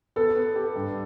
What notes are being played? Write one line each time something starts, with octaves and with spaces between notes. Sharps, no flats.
B3 A4
B3
G4
G2